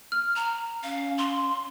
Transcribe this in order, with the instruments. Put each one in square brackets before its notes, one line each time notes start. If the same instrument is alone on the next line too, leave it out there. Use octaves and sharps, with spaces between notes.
[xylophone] F6
[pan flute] A#5
[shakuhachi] C#4 [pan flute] F5
[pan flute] C6